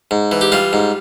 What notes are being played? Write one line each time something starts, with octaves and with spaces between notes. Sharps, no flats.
G#2
E3
G4
G3 F4
G#2